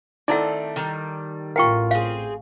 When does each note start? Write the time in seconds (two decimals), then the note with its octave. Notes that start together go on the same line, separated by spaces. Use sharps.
0.28 D#3 A3 C4 D#4 E4 A4 D5 F#5
0.76 D#3 G3
1.56 A1 A2 F4 A#4 F#5 G5 C#6
1.91 C4 G#4 F5